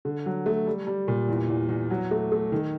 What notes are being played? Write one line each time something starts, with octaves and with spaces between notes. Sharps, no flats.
D3
F#3
A3
G3
G3
A#2
E2
E2
E2
F#3
A3
A3
D#3